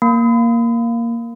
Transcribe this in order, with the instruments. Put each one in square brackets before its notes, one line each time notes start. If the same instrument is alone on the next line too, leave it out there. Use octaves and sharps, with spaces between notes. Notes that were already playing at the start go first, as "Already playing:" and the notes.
[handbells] A#3